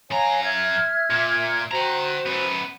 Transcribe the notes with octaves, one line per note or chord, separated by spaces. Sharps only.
F#2 C#5 F5 G#5 A#5
E5 F6 G#6
A#2
F#4 C5 G5 A#5
F#2 B3